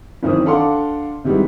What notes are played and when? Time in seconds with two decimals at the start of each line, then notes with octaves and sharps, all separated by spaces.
0.23 F#1 D#3 E3 C4 D#6
0.46 D4 A4 F5 F#5 C6 D6
1.24 C3 D#3 E3 G3 G#3 B3